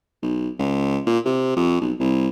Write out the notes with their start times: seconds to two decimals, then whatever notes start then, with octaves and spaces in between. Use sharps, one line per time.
0.22 B1
0.59 C#2
1.06 A#2
1.25 C3
1.56 F2
1.81 B1
2.00 C2